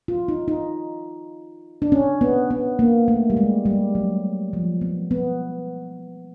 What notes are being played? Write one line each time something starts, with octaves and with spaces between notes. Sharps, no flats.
F4
D#4
D#4
D4
C#4
B3
B3
A#3
A3
G3
G#3
G3
F#3
F3
B3
B3